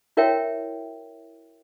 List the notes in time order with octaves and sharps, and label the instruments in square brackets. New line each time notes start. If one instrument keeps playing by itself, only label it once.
[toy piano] E4 F#4 A#4 C#5 E5 G5